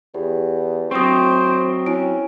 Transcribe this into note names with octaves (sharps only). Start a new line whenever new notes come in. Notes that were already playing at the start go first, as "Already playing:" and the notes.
E2 G4
F#3 C4 C5 C#6 D#6
C#4 E4 D7